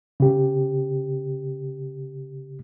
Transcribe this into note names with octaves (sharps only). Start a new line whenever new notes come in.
C#3 G4